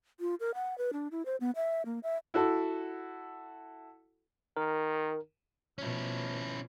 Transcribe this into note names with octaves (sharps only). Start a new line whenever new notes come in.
F4
A#4
F#5
B4
D4
E4
C5
B3
E5
A#3
E5
E4 F#4 A4
D#3 A#4
B2 F3 C#4 E4